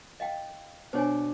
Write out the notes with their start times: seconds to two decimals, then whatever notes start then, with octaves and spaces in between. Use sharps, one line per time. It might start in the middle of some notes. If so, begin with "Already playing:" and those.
0.20 D#5 F5 G5
0.93 B2 D4 F#4 C5 C#5 G#5